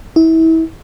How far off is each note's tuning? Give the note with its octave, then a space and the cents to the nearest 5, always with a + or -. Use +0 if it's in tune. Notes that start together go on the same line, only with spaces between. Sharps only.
E4 -30